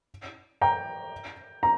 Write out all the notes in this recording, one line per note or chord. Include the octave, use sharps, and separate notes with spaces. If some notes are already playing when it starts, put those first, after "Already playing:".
G5 A#5
A#5